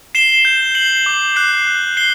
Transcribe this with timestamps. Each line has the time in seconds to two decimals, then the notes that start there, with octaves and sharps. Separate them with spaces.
0.15 C7 E7 G7
0.45 G6
0.75 C7 F#7
1.06 D6
1.36 F#6 C7
1.67 F#6
1.97 C7 G7